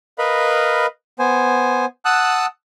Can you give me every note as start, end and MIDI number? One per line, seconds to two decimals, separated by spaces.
0.18 0.86 70
0.18 0.86 71
0.18 0.86 75
0.18 0.86 77
0.18 0.86 83
1.19 1.85 59
1.19 1.85 72
1.19 1.85 80
2.05 2.46 78
2.05 2.46 81
2.05 2.46 87
2.05 2.46 88
2.05 2.46 90